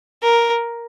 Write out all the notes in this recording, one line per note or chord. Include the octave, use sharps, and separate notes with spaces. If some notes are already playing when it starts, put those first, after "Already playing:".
A#4